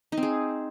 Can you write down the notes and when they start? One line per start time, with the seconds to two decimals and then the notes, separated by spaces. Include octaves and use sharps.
0.12 D#4
0.17 C4
0.23 G#4